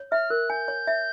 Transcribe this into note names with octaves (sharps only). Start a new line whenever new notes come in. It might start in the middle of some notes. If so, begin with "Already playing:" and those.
Already playing: C#5
E5 F6
A#4 F#6
G#5 G6
C#5
E5